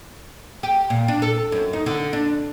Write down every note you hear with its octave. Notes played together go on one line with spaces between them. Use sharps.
G4
A#2
D4
A4
F#2
D#4
D3
D4